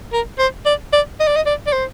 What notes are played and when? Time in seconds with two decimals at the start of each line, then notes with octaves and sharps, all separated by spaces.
0.13 A#4
0.38 C5
0.65 D5
0.93 D5
1.20 D#5
1.27 D5
1.36 D#5
1.46 D5
1.66 D5
1.72 C5